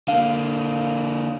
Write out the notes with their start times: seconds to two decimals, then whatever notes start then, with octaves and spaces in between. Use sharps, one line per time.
0.08 D3 A#3 F5